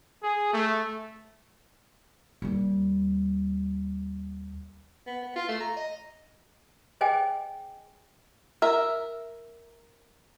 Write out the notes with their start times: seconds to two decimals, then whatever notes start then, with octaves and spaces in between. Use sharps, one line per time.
0.23 G#4
0.53 A3
2.42 D#2 G3
5.07 B3
5.23 B3
5.36 F4
5.49 A3
5.60 A#5
5.77 D#5
7.01 G#4 C5 D#5 G5 G#5
8.62 A#4 E5